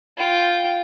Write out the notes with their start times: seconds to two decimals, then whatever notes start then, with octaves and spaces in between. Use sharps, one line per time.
0.18 F4 G5